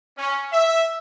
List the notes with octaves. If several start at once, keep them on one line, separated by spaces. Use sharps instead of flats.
C#4
E5